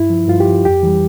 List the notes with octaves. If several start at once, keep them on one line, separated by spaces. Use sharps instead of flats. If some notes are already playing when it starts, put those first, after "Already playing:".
Already playing: G2 E4
F3
G2 F4
G4
F3
F2 G4
E3 G3